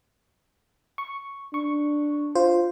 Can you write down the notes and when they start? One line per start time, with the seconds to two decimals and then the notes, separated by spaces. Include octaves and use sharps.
0.98 C#6
1.54 D4 C#6
2.35 F4 C5